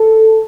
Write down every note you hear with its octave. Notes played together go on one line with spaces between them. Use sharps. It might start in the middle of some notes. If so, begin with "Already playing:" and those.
Already playing: A4